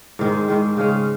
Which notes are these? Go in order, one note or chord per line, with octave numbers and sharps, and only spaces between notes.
G#2 D#3 G#3
G#2 D#3 G#3
C#3 G#3 C#4